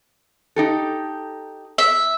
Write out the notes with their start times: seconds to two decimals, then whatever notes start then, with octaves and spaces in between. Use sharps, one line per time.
0.56 D#4 G4 A4
1.78 E5